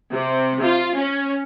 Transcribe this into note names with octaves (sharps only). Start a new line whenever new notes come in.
C3
F4
C#4